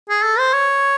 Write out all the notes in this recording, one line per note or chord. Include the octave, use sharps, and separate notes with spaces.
G#4
A4
C5
C#5